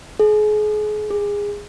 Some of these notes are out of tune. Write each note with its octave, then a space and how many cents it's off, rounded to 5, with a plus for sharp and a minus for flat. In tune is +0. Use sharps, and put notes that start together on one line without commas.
G#4 +35
G#4 -20